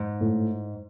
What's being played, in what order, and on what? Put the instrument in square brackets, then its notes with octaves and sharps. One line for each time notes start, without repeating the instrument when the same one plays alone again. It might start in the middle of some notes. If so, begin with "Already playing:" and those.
Already playing: [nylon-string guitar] G#2
[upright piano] A2